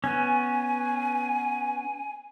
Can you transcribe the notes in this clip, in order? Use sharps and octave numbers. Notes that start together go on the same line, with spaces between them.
B3 C#4 G#5